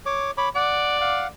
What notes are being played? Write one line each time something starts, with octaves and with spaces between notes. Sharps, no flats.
C#5 D6
C#5 B5 D6
D5 F#5
F5 F#5